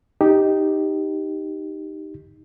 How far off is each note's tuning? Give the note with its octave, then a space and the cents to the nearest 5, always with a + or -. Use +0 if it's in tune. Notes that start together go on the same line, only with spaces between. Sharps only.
D#4 +0 G4 +0